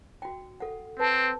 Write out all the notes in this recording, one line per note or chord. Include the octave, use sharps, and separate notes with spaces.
F#4 G5
A4 F#5
C4 B4 A5